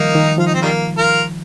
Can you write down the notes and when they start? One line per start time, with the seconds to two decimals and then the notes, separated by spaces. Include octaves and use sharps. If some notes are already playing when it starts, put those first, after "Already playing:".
Already playing: D#3 F3 G3 A#3 D#4
0.15 D#3
0.38 F3 F4
0.47 D#4
0.54 C4
0.62 D#3 G3 A#3
0.97 F4 A#4